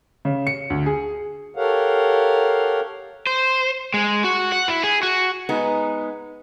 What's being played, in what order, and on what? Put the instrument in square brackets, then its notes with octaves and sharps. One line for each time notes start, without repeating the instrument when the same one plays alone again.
[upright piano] C#3
C#7
D2
G#4
[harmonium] G4 A4 A#4 C#5 F5 F#5
[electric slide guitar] C5
G#3
F#4
F#5
E4
G#4
F#4
[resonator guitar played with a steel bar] G#3 B3 D#4